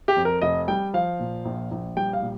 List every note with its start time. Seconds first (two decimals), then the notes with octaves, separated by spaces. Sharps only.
0.08 G4
0.16 F2
0.25 A#4
0.42 F1 D#5
0.68 G3 G5
0.94 F3 F5
1.20 A#2
1.45 A#1
1.71 A#1
1.97 G3 G5
2.13 F5
2.22 A#2